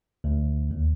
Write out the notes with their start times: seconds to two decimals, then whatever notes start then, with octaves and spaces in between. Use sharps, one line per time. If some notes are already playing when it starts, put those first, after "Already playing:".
0.24 D2
0.71 D#2